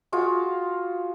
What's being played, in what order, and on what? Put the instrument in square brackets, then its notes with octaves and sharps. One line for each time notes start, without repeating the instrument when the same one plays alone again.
[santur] F4 F#4 G#4